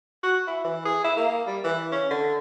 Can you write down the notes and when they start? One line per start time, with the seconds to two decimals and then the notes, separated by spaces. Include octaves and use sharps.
0.23 F#4
0.47 E4
0.64 E3
0.85 G#4
1.04 E4
1.17 A#3
1.47 G3
1.64 E3
1.92 C#4
2.10 D3